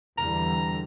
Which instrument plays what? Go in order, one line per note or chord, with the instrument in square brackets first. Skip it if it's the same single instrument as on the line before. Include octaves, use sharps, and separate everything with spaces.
[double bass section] E2 D3 G3 [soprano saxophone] A#5